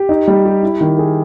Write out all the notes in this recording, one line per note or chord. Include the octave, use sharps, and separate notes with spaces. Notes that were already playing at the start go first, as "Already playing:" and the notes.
Already playing: G4
D#4
G3
G4
E4
D#3
G#4